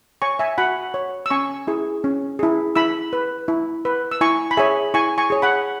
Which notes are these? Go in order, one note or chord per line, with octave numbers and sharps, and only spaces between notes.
C#5 G#5 C#6
E5 G#5
F#4 F#5 B5
C#5
E6
C#4 G#5 C#6
E4 G#4
C#4
E4 G#4
E4 B5 E6
B4
E4
B4
E6
E4 G#5 C#6
B5
G#4 C#5 E5 G#5
E4 G#5 C#6
G#5 C#6
G#4 C#5
F#5 B5